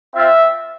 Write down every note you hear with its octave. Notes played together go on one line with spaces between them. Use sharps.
C4 F4 E5